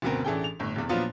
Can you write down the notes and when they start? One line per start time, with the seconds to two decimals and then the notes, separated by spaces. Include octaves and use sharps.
0.02 F#1 D2 B2 B3 C4 A#4
0.24 A1 E3 D4 G#4 A4 G5
0.44 F7
0.60 G1 A2
0.76 F1 E2
0.89 A#2 F3 F#3 B3 D4 F4